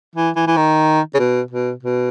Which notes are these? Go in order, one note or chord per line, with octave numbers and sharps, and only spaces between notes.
E3
E3
E3
D#3
C#3
B2
B2
B2